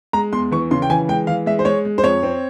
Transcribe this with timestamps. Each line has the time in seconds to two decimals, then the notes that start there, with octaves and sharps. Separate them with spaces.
0.13 G#3 A#5
0.32 E2 C6
0.51 E3 C#6
0.71 C#3 C6
0.82 G5
0.90 E3 G#5
1.08 G#3 G5
1.27 E3 F5
1.46 G#3 E5
1.59 C5
1.65 G#3 C#5
1.85 G#3
1.98 C5
2.03 F2 C#5
2.23 C4